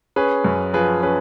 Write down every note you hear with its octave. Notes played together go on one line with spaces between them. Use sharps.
C#4 G#4 B4
F#2
F3 G#4 B4
C#4 G#4 B4